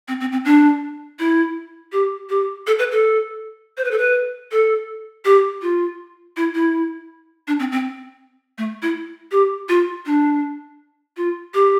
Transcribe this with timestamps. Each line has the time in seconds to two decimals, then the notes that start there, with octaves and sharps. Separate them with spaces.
0.08 C4
0.21 C4
0.32 C4
0.45 D4
1.19 E4
1.92 G4
2.29 G4
2.67 A4
2.79 B4
2.91 A4
3.77 C5
3.84 B4
3.91 A4
3.98 B4
4.52 A4
5.25 G4
5.62 F4
6.37 E4
6.55 E4
7.48 D4
7.59 C4
7.72 C4
8.58 A3
8.82 E4
9.32 G4
9.69 F4
10.06 D4
11.17 F4
11.54 G4